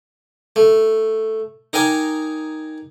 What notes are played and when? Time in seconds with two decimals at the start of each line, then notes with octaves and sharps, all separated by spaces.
0.56 A3
1.73 D#4 A#4 D#5 G5 G#5 D6